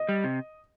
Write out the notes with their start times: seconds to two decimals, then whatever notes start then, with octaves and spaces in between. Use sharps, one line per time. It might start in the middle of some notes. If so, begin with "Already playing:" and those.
Already playing: D#5
0.09 G3
0.24 C3